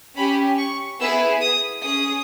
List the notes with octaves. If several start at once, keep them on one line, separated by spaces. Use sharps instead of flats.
C#4 G4 B5
C#6
B3 E4 G#4 E6
D#6
C#4 G#4 D#6